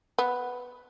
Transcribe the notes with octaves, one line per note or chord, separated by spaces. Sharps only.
B3